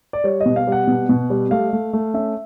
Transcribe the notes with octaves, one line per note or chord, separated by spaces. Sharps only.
D5
G3 C#5
D#5
B2
F5
G3 F#5
B2
B2
G3
A3 F5
A3
A3
C#4 E5